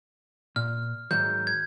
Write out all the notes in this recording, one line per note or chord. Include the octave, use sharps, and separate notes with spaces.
A#2 F6
G#2 D#3 F#3 G6
G#6